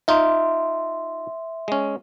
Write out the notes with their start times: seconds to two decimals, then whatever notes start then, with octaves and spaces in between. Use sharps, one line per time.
0.08 D#4 F4 E5 C6
1.68 G#3 C#4